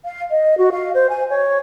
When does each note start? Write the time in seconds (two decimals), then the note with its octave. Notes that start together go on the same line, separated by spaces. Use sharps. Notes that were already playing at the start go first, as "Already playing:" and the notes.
0.05 F5
0.31 D#5
0.58 F#4
0.72 F5
0.94 C5
1.09 G#5
1.30 C#5